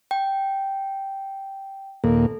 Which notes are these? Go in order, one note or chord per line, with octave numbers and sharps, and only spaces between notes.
G5
D#2 A#2 A#3 A4